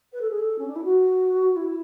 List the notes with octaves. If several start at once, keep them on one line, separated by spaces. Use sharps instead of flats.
B4
A4
G#4
A4
C#4
D4
E4
F#4
E4